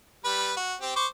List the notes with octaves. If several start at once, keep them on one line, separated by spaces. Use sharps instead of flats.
G3 B4 B5
F#4
C4 G4
C5 C#6 D6